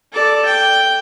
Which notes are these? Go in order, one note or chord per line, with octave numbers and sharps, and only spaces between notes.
A4 D5
G5